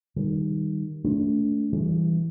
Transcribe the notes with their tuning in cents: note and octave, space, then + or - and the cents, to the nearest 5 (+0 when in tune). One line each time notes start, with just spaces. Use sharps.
D#3 +0 G3 +0
A3 +0 D4 -35
E3 +0 G3 -5